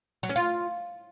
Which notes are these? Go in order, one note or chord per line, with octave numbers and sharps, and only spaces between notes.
F#3
C#4
F4